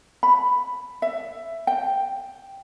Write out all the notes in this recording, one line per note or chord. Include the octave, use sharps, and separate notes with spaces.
B5
E5
G5